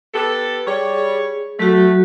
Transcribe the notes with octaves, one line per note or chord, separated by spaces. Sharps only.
B3 G4 A4
G3 G#4 C#5
F#3 A3 F#4